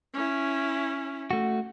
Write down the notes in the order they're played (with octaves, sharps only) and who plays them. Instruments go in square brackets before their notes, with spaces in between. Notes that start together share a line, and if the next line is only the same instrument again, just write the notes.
[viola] C#4 E4
[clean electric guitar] A3 F#4